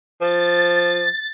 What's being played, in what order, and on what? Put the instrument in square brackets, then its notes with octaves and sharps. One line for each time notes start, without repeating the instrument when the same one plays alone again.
[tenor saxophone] F3 [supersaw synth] A6